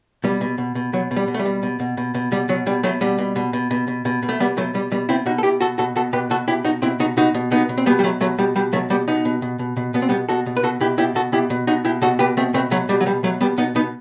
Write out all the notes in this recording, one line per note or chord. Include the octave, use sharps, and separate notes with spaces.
B2 G3
B2
B2
B2
B2 F#3
B2
G3
B2
A3
G3
B2
B2
B2
B2
B2
B2 G3
B2 F#3
B2 G3
B2 F#3 A3
B2 G3
B2
B2
B2
B2
B2
B2
B2
A3
B2 G3 B3
B2 F#3 A3
B2 G3
B2 G3
B2 C4 E4
B2 D#4 F#4
A4
B2 E4 G4
B2 F#4 A4
B2 F#4 A4
B2 F#4 A4
B2 G4 B4
B2 F#4 A4
B2 E4 G4
B2 D#4 F#4
B2 C4 E4
B2 D#4 F#4
B2 D#4 F#4
B2
B2 B3 D#4
B2
C4
B2 G3 B3
G3
B2 F#3 A3
B2 F#3 A3
B2 G3
B2 G3
B2 F#3 A3
B2 G3 B3
B2 B3 D#4
B2
B2
B2
B2
B2 B3
C4
B2 G3 B3
B2 F#4 A4
B2
B4
B2 F#4 A4
B2 E4 G4
B2 E4 G4
B2 F#4 A4
B2 E4 G4
B2
B2 D#4 F#4
B2 E4 G4
B2 F#4 A4
B2 G4 B4
B2 A3 C4
B2 A3 C4
B2 F#3 A3
B2 G3
F#3
B2 G3
B2 F#3 A3
B2 G3 B3
B2 B3 D#4
B2 B3 D#4